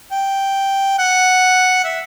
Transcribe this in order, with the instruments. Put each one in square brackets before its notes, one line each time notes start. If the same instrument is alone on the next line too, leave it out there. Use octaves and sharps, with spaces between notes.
[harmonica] G5
F#5
E5